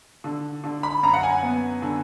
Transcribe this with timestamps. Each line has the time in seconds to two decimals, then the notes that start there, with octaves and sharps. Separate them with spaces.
0.24 D3
0.64 D3
0.83 B5
1.03 F#2 A#5
1.13 F#5
1.23 G#5
1.43 B3
1.82 D3